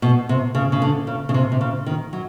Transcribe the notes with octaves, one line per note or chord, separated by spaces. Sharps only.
B2
C3
C#3
C#3
D3
C#3
C#3
C3
C3
C#3
D#3
F#3